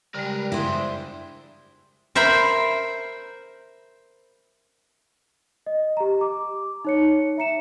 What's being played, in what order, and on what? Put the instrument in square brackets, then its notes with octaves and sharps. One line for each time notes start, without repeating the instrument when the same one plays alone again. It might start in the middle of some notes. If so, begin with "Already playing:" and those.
[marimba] C#3 G#3 [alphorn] G3 [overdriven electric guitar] A#4 B4
[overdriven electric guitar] D4 G#4 [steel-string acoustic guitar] E4 C5 E5
[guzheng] A#4 C5 E5 A#5 B5
[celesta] D#5
G4 A#5
D6
D#4 C#5 C#7
E5 A#5 C#7 E7